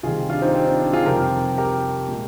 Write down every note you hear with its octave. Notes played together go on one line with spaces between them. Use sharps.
C3 D#3 G3 F4 G#4
D4 F4
C4 D#4
C4
D4
D4
F4 G#4
F2 C3 G3 G4 A#4
G4 A#4
A#2 G#3